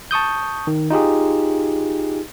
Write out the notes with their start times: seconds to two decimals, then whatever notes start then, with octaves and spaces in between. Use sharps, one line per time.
0.11 A5 C#6 D#6 G6
0.67 D#3
0.90 D#4 F4 G4 G#4